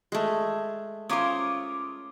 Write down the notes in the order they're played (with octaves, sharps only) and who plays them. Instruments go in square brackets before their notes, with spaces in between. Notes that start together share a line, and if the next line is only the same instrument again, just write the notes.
[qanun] G#3 A3
[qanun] C#4 C5 [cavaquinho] F4 A#4 C#5 [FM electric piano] D6 D#6